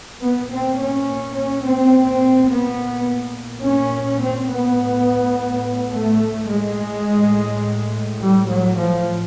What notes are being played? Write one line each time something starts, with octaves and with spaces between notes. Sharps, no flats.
A#2 B3
C4
C#4
C#4
C4
A#2 B3
C#4
C4
B3
A2
A3
G#3
A2
G3
F#3
F3